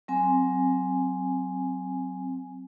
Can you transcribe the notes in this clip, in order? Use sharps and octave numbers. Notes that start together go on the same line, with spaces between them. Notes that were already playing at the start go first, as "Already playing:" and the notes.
F#3 C4 G#5